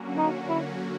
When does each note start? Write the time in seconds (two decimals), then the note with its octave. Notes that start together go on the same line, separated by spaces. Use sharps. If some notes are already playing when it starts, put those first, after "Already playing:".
Already playing: D3 F#3 A#3 C#4 F#4
0.18 D#4
0.49 E4